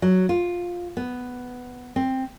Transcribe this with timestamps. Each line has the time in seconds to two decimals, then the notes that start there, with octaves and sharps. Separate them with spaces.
0.02 F#3
0.29 F4
0.97 B3
1.96 C4